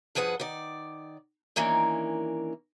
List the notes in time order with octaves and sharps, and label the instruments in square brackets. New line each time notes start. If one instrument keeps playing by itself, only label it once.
[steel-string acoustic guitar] G2 F3 G#4 B4 F#5
D#3 D5
D#3 E3 A#3 C#4 D4